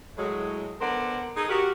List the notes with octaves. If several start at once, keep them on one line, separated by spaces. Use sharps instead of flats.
A2 F#3 G#3
D3 B3 A#4 C5 D5 F#5
D#4 G#4 A4
F#4 G4 A#4